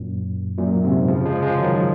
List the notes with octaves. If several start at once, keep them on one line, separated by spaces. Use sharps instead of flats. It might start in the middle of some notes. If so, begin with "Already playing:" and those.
Already playing: F#2 A#2
F#2 A#2
G#2 C3
C#3 F3
F3 G#3
F3 G#3
D#3 F#3